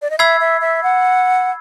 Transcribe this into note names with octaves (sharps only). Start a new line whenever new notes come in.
D5
D#5
E5 B5 E6 G#6 C7
E5
E5
F#5